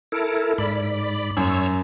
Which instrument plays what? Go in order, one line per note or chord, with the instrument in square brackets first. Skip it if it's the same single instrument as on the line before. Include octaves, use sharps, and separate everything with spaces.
[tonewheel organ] E4 A4 A#4
G#2 D5 B5
[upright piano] F#2 [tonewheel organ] C#5 E6